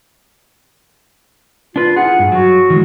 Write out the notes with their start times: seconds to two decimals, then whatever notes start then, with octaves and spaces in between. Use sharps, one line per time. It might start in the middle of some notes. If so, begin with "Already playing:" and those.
1.76 D4 F4 B4
1.97 E4 G#4 F#5
2.19 G2
2.32 F#3 F#4
2.70 D#3 E3 G#3